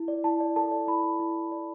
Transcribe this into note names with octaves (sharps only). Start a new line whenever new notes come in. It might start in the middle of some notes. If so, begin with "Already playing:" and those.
Already playing: E4
D5
E4 A5
D5
A4 A5
D5
E4 B5
E4
E4
E4
D5